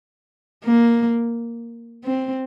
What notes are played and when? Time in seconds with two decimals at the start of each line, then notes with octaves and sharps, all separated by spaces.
0.65 A#3
2.04 C4